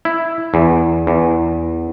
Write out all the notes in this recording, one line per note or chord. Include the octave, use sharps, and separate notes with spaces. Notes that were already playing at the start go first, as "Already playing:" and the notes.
E4
E2
E2